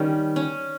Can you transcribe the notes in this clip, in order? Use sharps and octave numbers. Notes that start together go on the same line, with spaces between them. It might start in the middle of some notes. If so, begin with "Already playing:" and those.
Already playing: D#3 G3 C#4
C#4